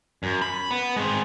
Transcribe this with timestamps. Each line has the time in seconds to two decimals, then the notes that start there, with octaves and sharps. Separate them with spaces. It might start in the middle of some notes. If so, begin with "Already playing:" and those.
0.23 F#2
0.42 B5
0.71 B3
0.96 G#3 C4